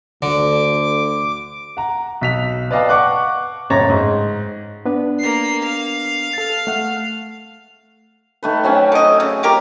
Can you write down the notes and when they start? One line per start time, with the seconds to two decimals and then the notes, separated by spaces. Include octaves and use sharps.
0.22 D2 D3 D6
1.77 F#5 A#5
2.21 B1 B6 F7
2.71 B4 D5 D#5 F5 G5 A5
2.89 F#5 C#6 D6 F#6
3.70 F#1 A2 C#5 A#5 A6 A#6
3.90 G#2
4.86 B3 D4 B4
5.20 A#3 C7
5.63 F5
6.33 A4 A6
6.67 A3 F#5 F6
8.43 D#3 A3 B4
8.63 F#3 C4 C#4
8.92 D#3 D#5
9.20 C#3
9.43 F4 G4 A#4